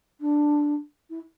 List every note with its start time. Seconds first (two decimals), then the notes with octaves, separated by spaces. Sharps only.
0.21 D4
1.10 E4